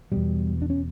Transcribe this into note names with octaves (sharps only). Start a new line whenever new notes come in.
E2 B2 G3
D4
C#4